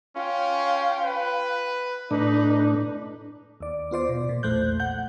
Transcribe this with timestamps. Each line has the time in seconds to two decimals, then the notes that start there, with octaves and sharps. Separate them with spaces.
0.16 C#4 F4 G5
1.04 B4
2.11 A2 D4 D#4 B4
3.60 D#2 D5
3.91 B3 F4 C5 D5
4.09 B2
4.29 A#2
4.43 A#1 E2 A3 C5 F#6 G6
4.80 A#1 F#5 G6